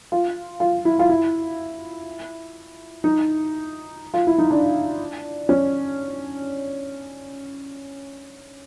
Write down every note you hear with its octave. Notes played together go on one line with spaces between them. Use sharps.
F4
F4
E4
F4
E4
D#4
F4
E4
D#4
D4
C#4